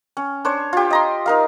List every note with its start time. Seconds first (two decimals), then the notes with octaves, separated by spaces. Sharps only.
0.17 C#4
0.45 D4 C5 C#5
0.73 F4 G4
0.90 D#5 A#5 C6
1.26 D#4 A#4 F5